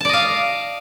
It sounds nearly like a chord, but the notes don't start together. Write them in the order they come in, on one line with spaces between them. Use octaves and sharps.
A5 D5 D#5 F5